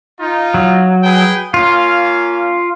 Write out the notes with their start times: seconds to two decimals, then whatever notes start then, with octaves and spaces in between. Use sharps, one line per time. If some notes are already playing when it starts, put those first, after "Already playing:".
0.19 D#4 F4
0.54 F#3
1.04 G#4 B4 G5
1.54 A#3 C#4 F4 F5